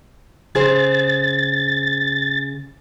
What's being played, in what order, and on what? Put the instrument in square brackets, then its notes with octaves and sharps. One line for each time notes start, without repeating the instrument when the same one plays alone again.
[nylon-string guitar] C#3 G#4 C5 [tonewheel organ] A6